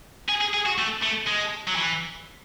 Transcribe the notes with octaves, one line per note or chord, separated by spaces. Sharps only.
G#4
G#4
G#4
F#4
A3
A3
G#3
F#3
E3